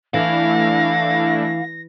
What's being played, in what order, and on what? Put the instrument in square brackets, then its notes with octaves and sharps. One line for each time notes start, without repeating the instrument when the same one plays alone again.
[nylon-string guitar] E3 [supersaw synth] A3 D4 E4 [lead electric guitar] F5 [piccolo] A#6